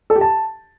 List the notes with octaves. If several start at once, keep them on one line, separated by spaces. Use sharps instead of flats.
A4
G4
A5